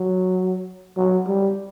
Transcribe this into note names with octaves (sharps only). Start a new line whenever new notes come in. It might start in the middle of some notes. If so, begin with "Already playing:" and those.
Already playing: F#3
F#3
G3